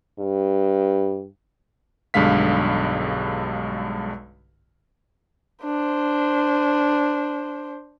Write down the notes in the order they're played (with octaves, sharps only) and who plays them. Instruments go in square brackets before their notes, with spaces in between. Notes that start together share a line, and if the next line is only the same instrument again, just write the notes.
[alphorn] G2
[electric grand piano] B1 G2 D3 G#3 F5 B6
[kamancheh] D4 C5